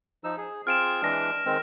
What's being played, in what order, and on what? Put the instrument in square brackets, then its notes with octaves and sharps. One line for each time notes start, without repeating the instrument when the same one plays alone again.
[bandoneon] F3 D#4 E6
G#4
[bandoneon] C4 F4 G#4 [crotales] F6 D7 E7
[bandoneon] E3 G#3 D4 [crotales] F6 A#6
[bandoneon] D#3 G#3 C4